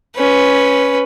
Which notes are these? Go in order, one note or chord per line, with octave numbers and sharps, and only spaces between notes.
C#4 B4